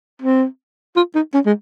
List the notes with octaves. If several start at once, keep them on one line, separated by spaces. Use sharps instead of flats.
C4
F4
D#4
C#4
G#3